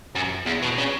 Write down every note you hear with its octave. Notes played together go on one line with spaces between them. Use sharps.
F#2
E2
B2
C#3